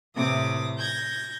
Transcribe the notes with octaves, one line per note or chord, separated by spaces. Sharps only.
A2 C3 E3 D6 D#6
G6 G#6 A#6